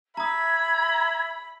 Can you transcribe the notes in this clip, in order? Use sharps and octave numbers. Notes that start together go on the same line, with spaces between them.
E5 A#5 B5 D#6 G#6